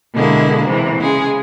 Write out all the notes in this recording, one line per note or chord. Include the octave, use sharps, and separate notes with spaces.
B2 D3 G#3 A#3 E4
C3 E3
C#3 G#3 G#4